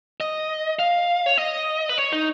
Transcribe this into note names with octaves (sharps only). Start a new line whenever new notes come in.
D#5
F5
C#5
D#5
B4
C#5
D#4